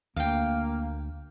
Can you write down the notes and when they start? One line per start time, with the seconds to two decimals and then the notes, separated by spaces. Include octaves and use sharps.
0.17 D2 A#3 F5 G5